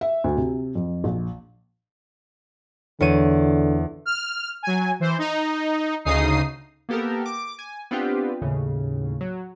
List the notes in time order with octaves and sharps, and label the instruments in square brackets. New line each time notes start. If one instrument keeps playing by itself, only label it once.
[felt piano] E5
D2
C3
F2
A#1
[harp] E2 C#5 D#7 [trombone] D3
[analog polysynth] F6
F#3 G#5
E3 C5
D#4
D2 C#3 D#4 D#6 C7
A#3 B3 G4 A4 A#4
D6
G#5
B3 C4 D4 F4 G4 B4
D#2 A2 C#3
F#3